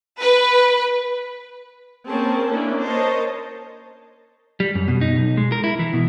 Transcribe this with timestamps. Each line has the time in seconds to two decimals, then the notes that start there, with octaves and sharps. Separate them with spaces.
0.21 B4
2.08 A#3 C4 C#4 G#4 A#4 A5
2.49 A#3 B3 C#4 D4 E4
2.84 A#4 C5 C#5 D#5 A5
4.60 G3
4.75 F#2
4.88 B2
5.01 D#4
5.16 B1
5.37 G#3
5.52 A#4
5.64 E4
5.79 E3
5.93 B2